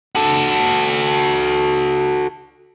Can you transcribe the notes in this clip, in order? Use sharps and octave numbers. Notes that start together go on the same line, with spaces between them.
F#4 A4